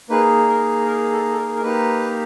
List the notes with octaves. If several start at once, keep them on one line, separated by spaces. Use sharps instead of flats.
A#3 D#4 G#4 B4
A#4
A#4
A4
A4
A#4
A#4
A#3 D#4 G4 B4